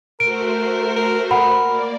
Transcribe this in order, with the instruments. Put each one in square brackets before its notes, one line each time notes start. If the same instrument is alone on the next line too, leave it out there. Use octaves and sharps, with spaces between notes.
[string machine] A3 F#4 C5 [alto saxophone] A#4 [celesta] D7
[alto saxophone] A#4
[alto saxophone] A#4 [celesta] F#5 B5
[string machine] A#3 D5